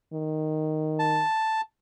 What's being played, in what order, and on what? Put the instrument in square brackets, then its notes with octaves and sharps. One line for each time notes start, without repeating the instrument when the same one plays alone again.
[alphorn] D#3
[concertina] A5